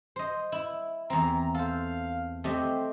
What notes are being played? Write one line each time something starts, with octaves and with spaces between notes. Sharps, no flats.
C5 D#5
E4
E2 C4 A#5
A4 C5 F5
A3 C4 G4 D#5